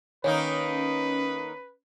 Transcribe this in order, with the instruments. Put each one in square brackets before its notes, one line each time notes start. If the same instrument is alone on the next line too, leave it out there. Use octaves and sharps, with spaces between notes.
[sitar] D#3 A#3 D#4 [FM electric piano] C#4 [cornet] B4